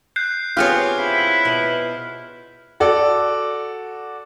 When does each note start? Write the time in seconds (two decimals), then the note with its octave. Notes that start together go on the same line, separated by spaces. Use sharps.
0.16 F#6 G6 C7
0.57 B3 C4 F4 G4 G#4 C#5 F6 F#6
0.99 E4
1.45 B2
2.80 F#4 A4 D5